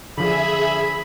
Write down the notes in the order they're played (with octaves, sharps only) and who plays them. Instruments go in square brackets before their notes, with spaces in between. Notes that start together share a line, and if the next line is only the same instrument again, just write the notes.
[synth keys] D3 F3 [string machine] G#4 E5 [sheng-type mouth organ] B5